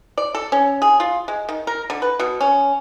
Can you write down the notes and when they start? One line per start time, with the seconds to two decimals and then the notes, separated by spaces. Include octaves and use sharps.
0.18 D5
0.35 A4
0.52 C#4
0.82 G#4
1.00 F4
1.28 G#3
1.49 D#3
1.67 A#4
1.90 D3
2.02 B4
2.19 B2
2.41 C#4